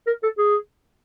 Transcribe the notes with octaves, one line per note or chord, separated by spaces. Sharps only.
A#4
A4
G#4